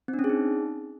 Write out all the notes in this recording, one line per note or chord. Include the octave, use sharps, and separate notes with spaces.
C4
D4
C#4
G#4
D#4